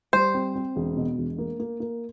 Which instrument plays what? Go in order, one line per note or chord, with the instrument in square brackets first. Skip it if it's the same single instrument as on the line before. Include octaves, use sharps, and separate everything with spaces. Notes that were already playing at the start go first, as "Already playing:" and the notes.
[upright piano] G3 [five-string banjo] C5
[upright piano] C4
C4
E1
B2
E1
A#3
A#3
A#3